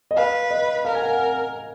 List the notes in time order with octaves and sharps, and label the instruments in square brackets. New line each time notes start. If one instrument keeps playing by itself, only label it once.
[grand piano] D#5
[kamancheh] B4 [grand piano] F5
[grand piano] D#5
[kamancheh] A#4 [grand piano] F5
[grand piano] G#5
F#5